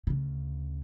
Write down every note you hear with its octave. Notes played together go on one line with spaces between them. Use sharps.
D2 C#3